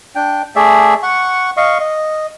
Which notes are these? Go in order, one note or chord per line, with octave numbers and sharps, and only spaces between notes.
D4 G5
A3 G#4 D5 E5
F#5 C#6
D#5 F5 C#6
D#5